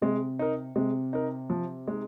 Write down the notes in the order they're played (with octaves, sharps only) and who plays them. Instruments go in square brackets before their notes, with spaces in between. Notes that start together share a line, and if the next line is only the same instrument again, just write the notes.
[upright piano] C3 [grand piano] G#3
[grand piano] D#4 A#4
[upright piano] C3 [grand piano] G#3
[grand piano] D#4 A#4
F3
G#3 D#4